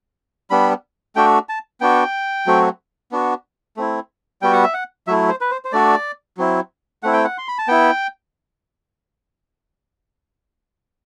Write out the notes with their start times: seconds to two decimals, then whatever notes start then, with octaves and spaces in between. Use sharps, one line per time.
0.50 G3 B3 D4 B5
1.16 A3 D4 F#4 G5
1.49 A5
1.81 B3 D4 F#4 G5
2.46 F#3 A3 C4 F#4
3.11 B3 D4 F#4
3.77 A3 C4 E4
4.42 G3 B3 F#4 G5
4.53 F#5
4.63 E5
4.74 F#5
5.07 F#3 A3 E4 E5
5.29 C5
5.41 B4
5.51 C5
5.65 C5
5.72 A3 D4 F#4 D5
6.37 F#3 C4 E4
7.03 A3 C4 E4 F#5
7.13 G5
7.24 F#5
7.38 C6
7.48 B5
7.58 A5
7.68 B3 E4 G5